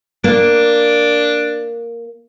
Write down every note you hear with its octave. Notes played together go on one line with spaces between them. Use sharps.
A#3 D4